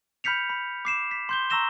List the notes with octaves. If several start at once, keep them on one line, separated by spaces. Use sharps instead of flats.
B5 F6 G6 B6 C#7 F7
B5
D6 C7 E7
B6
C6 G6 G7
A#5 C#6 E6 A#6 E7 G7